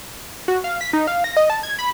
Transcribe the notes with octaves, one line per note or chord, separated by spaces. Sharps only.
F#4
F5
B6
D#4
F5
A#6
D#5
A5
G#6
B5